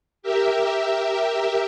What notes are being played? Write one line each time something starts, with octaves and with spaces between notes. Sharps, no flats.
G4 A#4 E5